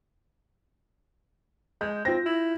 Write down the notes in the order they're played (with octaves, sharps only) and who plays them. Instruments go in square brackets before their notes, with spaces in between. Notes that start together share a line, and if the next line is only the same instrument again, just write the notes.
[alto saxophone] G#3 [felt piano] G6
[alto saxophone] C4 [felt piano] F4 A#6
[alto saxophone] E4